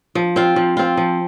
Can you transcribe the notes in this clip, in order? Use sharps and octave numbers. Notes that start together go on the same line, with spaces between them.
F3
C4 F4
F3
C4 F4
F3